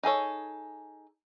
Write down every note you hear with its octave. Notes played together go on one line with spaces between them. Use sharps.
D#4 G#4 A4 C#5